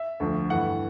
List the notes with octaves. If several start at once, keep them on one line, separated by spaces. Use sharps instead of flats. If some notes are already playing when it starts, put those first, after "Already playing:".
Already playing: E5
D2 D3 F3
G2 E3 A3 F#5